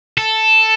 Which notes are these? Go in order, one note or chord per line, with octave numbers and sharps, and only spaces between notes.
A4